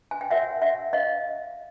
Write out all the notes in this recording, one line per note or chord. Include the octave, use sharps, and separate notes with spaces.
G#5
G5
F#4 A#4 C#5 E5 F#5
E5 F#5
D#5 F5